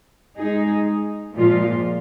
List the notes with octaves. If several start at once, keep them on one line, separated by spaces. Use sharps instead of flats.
G#3 D#4 G#4
A#2 F3 G#3 F4